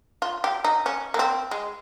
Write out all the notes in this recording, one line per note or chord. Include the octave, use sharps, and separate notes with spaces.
F4
G4
D#4
C#4
A#3
C4
G#3